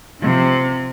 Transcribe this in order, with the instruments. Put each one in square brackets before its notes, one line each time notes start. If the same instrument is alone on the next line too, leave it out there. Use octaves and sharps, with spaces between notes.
[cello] C3 F3